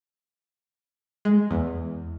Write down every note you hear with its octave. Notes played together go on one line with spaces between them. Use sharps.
G#3
E2